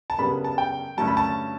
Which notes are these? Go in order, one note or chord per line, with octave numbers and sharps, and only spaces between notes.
A5
F#2 C#3 G3 B3 D4 B5
A5
G5
G2 D3 F#3 A3 C#4 A5
B5
A5